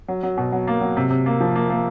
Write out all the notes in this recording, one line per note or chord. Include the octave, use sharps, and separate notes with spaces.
F#3
F#3
B2
F#3
A#3
F#3
C3
C3
A#3
F3
A#3
A#3